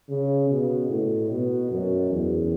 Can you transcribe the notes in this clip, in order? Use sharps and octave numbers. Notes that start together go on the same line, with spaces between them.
C#3
B2
A2
B2
F#2
E2